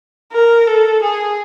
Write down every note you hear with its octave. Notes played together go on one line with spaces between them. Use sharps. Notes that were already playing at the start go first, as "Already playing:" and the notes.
A#4
A4
G#4